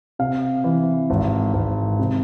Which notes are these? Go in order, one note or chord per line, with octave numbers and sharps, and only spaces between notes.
C3 F5
E3
G#1
G#1
C3